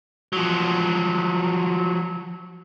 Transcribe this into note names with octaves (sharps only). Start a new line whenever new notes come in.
F3 F#3